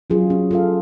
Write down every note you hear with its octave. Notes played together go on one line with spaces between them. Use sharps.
F#3 C#4 F4 G#4
C#4
F4 A4 F5